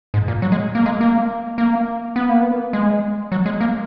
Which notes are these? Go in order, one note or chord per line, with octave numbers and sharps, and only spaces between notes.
G#2
A#2
F#3
G#3
A#3
G#3
A#3
A#3
B3
A#3
B3
G#3
F#3
G#3
A#3